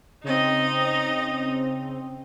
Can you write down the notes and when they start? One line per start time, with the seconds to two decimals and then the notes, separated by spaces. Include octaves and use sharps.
0.24 C#3 C4 D#4 D#5